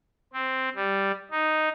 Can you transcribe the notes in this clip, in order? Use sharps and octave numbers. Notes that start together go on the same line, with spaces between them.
C4
G3
D#4